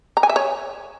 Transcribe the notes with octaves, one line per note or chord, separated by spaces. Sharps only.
A#5
G#5
E5
C#5